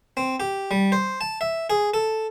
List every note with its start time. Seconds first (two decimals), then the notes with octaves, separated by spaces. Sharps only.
0.17 C4
0.40 G4
0.71 G3
0.92 C5
1.21 A5
1.41 E5
1.70 G#4
1.94 A4